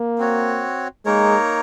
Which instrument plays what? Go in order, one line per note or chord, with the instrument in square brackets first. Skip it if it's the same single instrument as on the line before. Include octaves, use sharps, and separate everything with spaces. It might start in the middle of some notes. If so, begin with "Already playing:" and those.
Already playing: [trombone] A#3
[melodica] C4 F#4 C#5
[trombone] G#3 [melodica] A#3 D#4 A#4 C#5